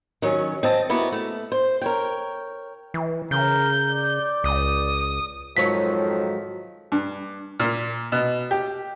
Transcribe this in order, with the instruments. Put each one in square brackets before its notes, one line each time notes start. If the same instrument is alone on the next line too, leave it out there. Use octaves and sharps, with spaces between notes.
[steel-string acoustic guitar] D#3 F#3 C#4
C4 D#5 A5
A#3 B3 E4 F#4
A3
C5
A#4 C#5 G5
[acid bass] E3
[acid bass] C#3 [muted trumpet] A#4 [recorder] G6
[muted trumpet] D5
[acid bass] C#2 [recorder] D#6
[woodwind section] F2 D#3 F3 [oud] G#2 F#3 C#5 [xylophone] B6
[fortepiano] G2
A#2
B2
G4